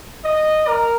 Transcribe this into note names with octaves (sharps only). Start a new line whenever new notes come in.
D#5
A#4